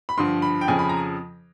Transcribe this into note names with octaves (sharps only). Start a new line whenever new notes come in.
B5
G2 D3 F3 C6
B5
G5
F2 C#3 F3 G#5
B5
A#5